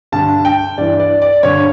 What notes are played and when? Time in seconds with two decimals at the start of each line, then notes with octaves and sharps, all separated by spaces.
0.12 G2 D3 A5
0.45 G5
0.78 G2 E3 D5
1.00 D5
1.22 D5
1.43 G2 D3 C#5